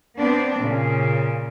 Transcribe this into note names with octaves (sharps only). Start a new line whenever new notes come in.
B3 C4 D4
A#2 C#3